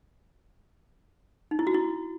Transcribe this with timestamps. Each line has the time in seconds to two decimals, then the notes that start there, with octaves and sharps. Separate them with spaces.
1.51 D#4
1.59 E4
1.67 F#4
1.74 E4